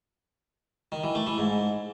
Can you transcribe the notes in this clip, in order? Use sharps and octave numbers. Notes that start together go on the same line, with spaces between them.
D#3
E3
A3
E3
G#2